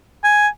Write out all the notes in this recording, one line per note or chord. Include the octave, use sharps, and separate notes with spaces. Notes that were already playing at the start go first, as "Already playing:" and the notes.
G#5